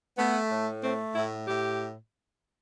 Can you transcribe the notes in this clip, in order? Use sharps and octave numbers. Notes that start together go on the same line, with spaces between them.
A3 B3
A2
A3 C4
A2 E4
A2 G4